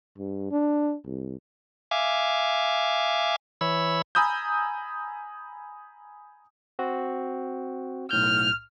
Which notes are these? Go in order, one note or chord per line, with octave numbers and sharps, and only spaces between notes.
G2
D4
C2
E5 F5 G#5 D6
E3 C#5 B5 E6
G#5 A#5 B5 D#6 E6 G6
C4 F#4
B1 A2 F6 G6